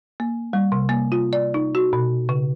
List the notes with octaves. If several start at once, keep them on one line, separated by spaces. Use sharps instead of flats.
A#3
G3
C3
A#3
F4
D5
D#4
F#4
B2
C#3